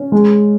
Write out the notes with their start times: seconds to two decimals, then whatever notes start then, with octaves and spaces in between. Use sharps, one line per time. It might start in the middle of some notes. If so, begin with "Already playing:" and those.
Already playing: C#4
0.12 G#3